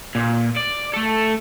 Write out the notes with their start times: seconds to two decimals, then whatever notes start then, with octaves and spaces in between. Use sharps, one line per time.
0.15 A#2
0.57 D5
0.94 A3 A4